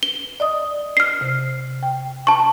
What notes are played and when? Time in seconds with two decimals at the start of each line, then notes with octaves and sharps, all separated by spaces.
0.03 G7
0.40 D5 D#5 D#6
0.97 F6 C7
1.21 C3
1.83 G5
2.27 A5 C#6